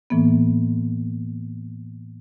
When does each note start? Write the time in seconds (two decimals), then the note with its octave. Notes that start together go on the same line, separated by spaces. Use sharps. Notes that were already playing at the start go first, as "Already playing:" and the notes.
0.10 A2 E3 A#3 B3